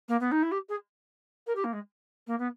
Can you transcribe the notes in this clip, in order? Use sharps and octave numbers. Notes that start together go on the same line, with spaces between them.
A#3
B3
D#4
E4
G4
G#4
A#4
G4
A#3
G#3
A#3
B3